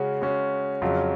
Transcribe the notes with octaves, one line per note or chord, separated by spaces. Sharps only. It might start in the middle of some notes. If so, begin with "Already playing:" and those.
Already playing: C#3 G#3 C#4 F#4
C#3 G#3 C#4 F#4
F2 C#3 F#3 C#4 F4